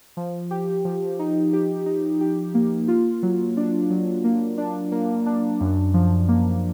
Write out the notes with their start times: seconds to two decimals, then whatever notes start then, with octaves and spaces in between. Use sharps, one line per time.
0.17 F3
0.51 G4
0.85 F3
1.19 D#4
1.53 G4
1.86 D#4
2.21 G4
2.54 A#3
2.88 F4
3.23 F#3
3.57 D4
3.90 F#3
4.24 A#3
4.58 D4
4.92 A#3
5.26 D4
5.60 F#2
5.94 F3
6.28 A#3